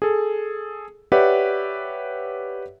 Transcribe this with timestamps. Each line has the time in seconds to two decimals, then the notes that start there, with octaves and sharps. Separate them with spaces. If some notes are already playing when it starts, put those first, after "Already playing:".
0.02 G#4 A4
1.12 G4 B4 C#5 D5 E5 F#5